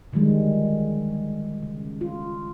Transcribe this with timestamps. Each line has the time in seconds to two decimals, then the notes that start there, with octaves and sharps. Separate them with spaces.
0.13 D3 D#3 F3 G3 G#3
1.63 C#3
2.01 F4